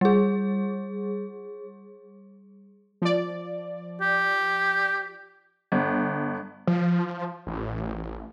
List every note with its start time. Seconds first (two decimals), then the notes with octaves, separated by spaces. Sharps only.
0.01 G3 G#4
3.02 F3 D5
4.01 G4
5.72 G1
6.67 F3
7.47 A1